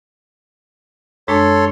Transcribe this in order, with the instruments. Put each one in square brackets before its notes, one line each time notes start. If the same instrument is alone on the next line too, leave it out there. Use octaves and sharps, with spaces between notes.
[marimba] F#2 G#3 D4 [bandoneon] A4 C#5 C6